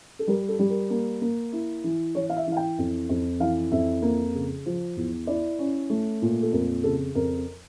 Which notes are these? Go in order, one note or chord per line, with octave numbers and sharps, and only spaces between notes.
A4
G3 A#4
A4
G3
A#4
A#3
A#3
E4
E3
E3 C#5
F5
E5
E3 F5
G5
F2
F2
E3 F5
F2 E5
A#3
C#3
F3
E2
E4 D5
C#4
A3
A#2
A4
F2 A#4
C#3 A4
F2 A#4